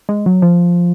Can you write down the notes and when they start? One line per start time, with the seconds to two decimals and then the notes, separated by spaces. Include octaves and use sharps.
0.09 G#3
0.26 F#3
0.42 F3